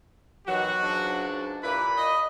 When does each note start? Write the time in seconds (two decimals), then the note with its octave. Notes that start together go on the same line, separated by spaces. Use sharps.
0.47 B2 D#3 E3 F#3 F#4
0.82 C#2 G#2 D4
1.63 A#2 E4 G4 B4 B5
1.97 D#5